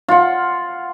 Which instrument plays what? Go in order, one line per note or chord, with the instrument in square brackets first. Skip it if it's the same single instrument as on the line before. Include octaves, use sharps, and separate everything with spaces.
[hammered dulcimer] F4 F#5